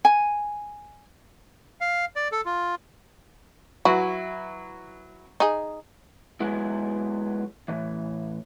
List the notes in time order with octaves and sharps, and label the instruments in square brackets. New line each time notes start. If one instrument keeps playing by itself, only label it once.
[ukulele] G#5
[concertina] F5
D5
A4
F4
[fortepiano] F#3 E4 B4 [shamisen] F#4
[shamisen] D#4 G#4
[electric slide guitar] F#3 G#3 B3 E4
A2 E3